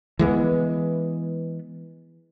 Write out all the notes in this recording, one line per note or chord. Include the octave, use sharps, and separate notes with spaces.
E3 G#3 A3 B3